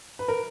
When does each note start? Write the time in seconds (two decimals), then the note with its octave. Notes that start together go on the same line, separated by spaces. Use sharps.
0.19 B4
0.28 A#4